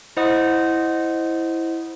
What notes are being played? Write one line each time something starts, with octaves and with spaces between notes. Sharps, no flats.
E4 C5 D#5 F#5 D#6